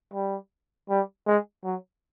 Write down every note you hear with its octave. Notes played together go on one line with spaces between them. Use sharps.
G3
G3
G#3
F#3